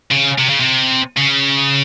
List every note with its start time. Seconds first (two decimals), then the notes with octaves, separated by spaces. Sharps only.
0.11 C#3
0.38 C3
0.49 C#3
0.60 C3
1.17 C#3